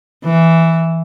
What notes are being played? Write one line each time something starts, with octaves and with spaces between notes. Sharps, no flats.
E3